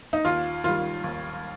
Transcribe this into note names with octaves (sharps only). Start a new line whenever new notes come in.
D#4
D#2 F4
D#3 G3 F4
D#2